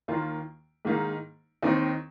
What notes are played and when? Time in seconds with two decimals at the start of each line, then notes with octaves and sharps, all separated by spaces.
0.08 D#2 D#3 A#3 F4
0.85 G#2 D#3 A#3 D#4
1.62 D#2 D#3 C4 D#4